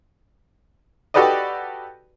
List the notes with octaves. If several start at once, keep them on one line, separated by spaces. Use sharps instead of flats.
F#4 G4 A4 B4 D5 D#5